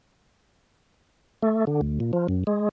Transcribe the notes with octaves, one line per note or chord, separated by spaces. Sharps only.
A3
D3
D2
A#2
F3
F#2
G#3